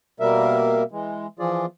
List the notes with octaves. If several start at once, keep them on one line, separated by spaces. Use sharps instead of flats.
B2 G3 A#3 A#4 E5
E3 G#3
E3 F3 F4 G#4 D5